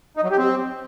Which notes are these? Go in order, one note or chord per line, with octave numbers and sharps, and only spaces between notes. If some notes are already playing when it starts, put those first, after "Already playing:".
D#4
F#3
G4
C4